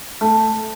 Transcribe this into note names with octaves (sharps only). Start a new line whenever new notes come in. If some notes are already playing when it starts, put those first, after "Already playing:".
A3